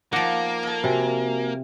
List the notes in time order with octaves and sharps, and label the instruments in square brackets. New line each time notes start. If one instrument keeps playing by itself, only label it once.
[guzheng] F3 D#4 [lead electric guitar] A#3 [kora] F#5 [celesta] D6 A#6
[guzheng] A4 D#5
[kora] C3 [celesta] F#4 G#5